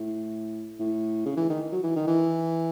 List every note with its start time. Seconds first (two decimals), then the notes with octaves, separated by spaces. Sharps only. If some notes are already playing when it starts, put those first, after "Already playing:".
Already playing: A2
0.80 A2
1.26 C#3
1.37 E3
1.50 D#3
1.72 F#3
1.83 E3
1.96 D#3
2.07 E3